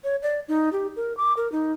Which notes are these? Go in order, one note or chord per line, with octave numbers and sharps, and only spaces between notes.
C#5
D5
D#4
G4
A#4
D6
A#4
D#4